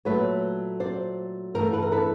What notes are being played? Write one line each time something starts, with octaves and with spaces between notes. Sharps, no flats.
A#2 F#3 A3 B4 C#5
C5 D5
G2 E3 A3 A#4 C5
A4 B4
A#4
A4 B4